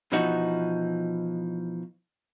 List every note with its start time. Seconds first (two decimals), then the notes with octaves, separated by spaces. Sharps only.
0.12 B2 E3 F3 D#4 F#4